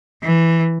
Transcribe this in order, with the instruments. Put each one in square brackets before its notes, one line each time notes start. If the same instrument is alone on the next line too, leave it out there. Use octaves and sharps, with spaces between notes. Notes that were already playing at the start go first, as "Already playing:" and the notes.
[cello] E3